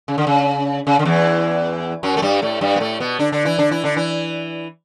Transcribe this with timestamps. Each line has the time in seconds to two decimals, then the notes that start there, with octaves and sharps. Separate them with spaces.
0.08 C#3
0.18 D3
0.27 C#3
0.87 C#3
0.99 D3
1.05 E2 E3
2.03 F#2 F#3
2.17 A3
2.22 G2 G3
2.42 A2 A3
2.61 G2 G3
2.76 B3
2.80 A2 A3
3.00 B2 B3
3.19 D3 D4
3.32 D3 D4
3.45 E3 E4
3.59 D3 D4
3.71 E3 E4
3.84 D3 D4
3.96 E3 E4